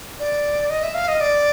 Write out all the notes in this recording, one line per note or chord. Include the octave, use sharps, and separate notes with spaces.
D5
D#5
E5
F5
D#5
D5